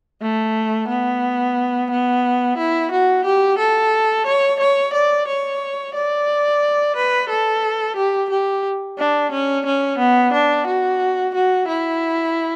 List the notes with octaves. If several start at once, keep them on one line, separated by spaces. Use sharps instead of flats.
A3
B3
B3
E4
F#4
G4
A4
C#5
C#5
D5
C#5
D5
B4
A4
G4
G4
D4
C#4
C#4
B3
D4
F#4
F#4
E4